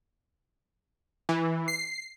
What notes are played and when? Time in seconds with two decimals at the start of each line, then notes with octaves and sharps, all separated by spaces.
1.29 E3
1.68 C7